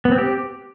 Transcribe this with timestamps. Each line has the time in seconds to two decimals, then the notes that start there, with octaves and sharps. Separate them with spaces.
0.05 B3
0.12 C4
0.18 G4